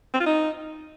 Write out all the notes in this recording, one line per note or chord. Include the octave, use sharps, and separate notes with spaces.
C4
F4
D#4